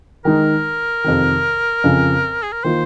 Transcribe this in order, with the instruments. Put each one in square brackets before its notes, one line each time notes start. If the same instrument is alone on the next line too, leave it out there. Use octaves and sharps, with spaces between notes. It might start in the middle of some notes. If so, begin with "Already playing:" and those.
[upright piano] D#3 G#3 D#4 [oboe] A#4
[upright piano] F2 C3 D#3
F2 C#3 F3 C4
[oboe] G#4
A#4
[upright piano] D#3 A#3 F4 [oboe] C5